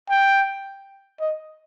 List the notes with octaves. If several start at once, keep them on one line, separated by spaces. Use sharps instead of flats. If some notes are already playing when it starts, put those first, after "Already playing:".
G5
D#5